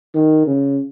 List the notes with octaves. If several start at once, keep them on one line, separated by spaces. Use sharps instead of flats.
D#3
C#3